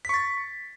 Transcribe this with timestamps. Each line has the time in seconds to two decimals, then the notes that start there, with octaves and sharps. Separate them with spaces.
0.05 B6
0.09 C#6
0.14 A6